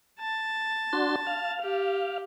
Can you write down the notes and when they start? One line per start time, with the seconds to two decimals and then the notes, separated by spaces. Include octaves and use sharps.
0.20 A5
0.93 D4 F#4 C6
1.27 F5
1.61 G4